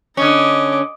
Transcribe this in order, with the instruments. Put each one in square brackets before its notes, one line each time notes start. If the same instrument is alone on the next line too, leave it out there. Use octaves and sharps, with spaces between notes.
[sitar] D3 C#4 [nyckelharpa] D#5 D6